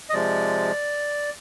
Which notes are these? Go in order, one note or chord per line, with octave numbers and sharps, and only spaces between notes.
D#5
C3 F3 G#3 D5